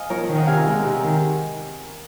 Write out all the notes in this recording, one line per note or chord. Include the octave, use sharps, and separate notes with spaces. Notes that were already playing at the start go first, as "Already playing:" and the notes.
Already playing: D#5 F5 G#5
F3 A#4 C#5
D#3
D#5 F#5
C3 F5 G#5
F#5 A#5
G#3
C3
D#3